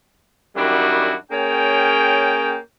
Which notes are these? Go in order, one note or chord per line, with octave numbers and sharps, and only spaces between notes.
F#2 D#3 G3 D4 E4 F#4
A#3 C#4 G#4 C#5 G5